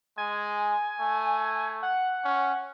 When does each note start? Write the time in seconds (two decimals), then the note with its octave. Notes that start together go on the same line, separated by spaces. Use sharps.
0.18 G#3 G#5
1.00 A3
1.83 F#5
2.24 C#4